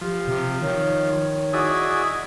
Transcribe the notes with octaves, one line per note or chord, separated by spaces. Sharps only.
F3 G4
C3
D#3 C#5
E4 F#4 G#4 D5 D#5 G#5